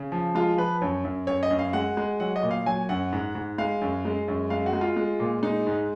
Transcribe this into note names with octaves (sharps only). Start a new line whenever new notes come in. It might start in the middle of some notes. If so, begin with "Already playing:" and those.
Already playing: C#3
F3
G#3 F4
F3 B4
F#2 C#5
F#2
F#2 C#5
D#5
F#2
F5
G#3 F#5
G#3
F#3 F#5
D#5
A#2
F5
F#3 G#5
F#2 F#5
G#2
G#2
G#3 F5
F#2
G#3
F#2
G#3 F5
F#4
G#3
F4
G#3
A#2
G#3 D#4
G#2